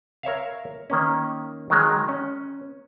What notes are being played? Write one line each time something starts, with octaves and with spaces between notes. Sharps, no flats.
A#4 C#5 E5 F5
D#3 A#3 C#4
D#3 F#3 G#3
C#4